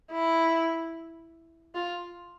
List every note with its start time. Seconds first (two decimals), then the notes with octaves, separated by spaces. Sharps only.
0.12 E4
1.75 F4